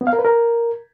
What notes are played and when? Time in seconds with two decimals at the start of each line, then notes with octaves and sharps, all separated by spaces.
0.01 B3
0.07 F5
0.13 A#4
0.19 B4
0.25 A#4